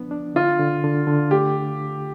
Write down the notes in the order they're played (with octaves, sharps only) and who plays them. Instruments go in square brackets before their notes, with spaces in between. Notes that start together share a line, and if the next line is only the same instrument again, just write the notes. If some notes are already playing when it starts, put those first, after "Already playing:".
Already playing: [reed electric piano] F3 B3 D4
D4
[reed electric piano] D3 [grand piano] F4
[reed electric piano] D3
D3
D3
[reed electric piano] A3 [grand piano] G4